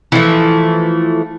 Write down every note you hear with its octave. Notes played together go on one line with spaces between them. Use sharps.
E3 F3 A3